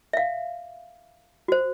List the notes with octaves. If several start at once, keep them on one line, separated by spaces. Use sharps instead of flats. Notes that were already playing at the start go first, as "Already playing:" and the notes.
E5 F5
F#4 C5